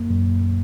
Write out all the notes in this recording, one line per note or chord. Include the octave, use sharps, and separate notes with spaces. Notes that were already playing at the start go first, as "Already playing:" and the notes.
Already playing: F#2 A#3
F#2